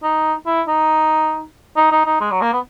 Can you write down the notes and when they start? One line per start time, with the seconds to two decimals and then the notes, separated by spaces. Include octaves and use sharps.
0.03 D#4
0.46 E4
0.68 D#4
1.77 D#4
1.92 D#4
2.06 D#4
2.21 G#3
2.31 F#3
2.42 A#3
2.53 B3